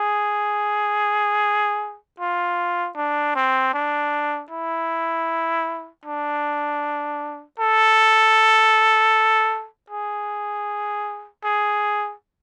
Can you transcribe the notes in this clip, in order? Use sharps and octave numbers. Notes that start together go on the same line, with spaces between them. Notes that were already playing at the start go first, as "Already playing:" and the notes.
Already playing: G#4
F4
D4
C4
D4
E4
D4
A4
G#4
G#4